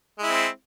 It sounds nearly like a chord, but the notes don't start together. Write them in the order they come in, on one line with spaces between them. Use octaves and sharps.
G#3 E4 C4